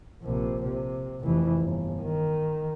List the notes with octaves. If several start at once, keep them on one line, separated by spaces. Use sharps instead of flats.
A#1 C3
C3
F1 E3
G1
D#3